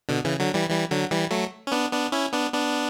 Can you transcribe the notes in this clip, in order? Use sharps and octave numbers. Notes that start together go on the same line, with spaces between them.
B2 D3
C#3 E3
D3 F#3
E3 G3
E3 G3
D3 F#3
E3 G3
F#3 A3
C#4
B3 D4
B3 D4
C#4 E4
B3 D4
B3 D4